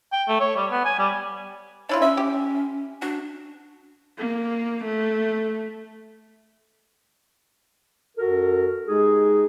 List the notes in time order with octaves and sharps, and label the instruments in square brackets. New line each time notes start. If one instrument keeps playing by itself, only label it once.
[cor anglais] G5
A3
C#5
G3
B3
G#5
G3
[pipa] D4 E4 F4 [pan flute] C#5
[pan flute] C#4 [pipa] E5
[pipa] G4
[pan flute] D4 [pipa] F#4
[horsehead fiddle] A#3
A3
[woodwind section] F#2 F#4 A4 A#4
G#3 D#4 G4 G#4